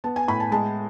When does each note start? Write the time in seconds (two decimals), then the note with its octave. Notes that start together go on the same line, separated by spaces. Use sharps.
0.04 B3 A5
0.16 G#5
0.28 A2 B5
0.40 A5
0.52 G#3 A5